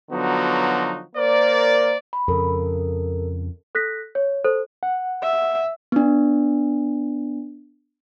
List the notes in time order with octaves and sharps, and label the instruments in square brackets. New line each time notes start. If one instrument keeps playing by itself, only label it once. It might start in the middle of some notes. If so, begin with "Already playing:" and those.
[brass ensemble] D3 F3 F#3 B3 D#4 F#4
A#3 A#4 C5 D5
[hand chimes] B5
[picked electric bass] F2 C#3 [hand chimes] A4 A#4
[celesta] A4 F#6 A#6 B6
C#5
A4 C5
[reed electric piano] F#5
[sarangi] E5
[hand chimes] B3 D4